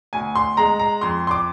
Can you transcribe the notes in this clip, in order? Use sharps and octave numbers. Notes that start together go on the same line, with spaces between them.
D2 G#5
C6
G#3 A#5
A#5
F2 C6
C6
D6